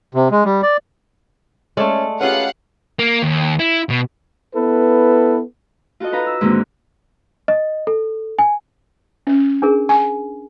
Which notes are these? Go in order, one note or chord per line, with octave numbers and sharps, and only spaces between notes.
C3
G#3
G3
D5
G#3 A3 C#4 A4 D5
C#4 F4 G4 G#4 B4 F5 F#5
A#3
D#2
E4
B2
B3 E4 A4 B4
F4 F#4 A4 D#5
D#4 B4 F5 A#5
E6
G#2 D3 D#3 A#3 C4 F#4
D#5
A4
G#5
C#4
D4 G#4 A#4
G#5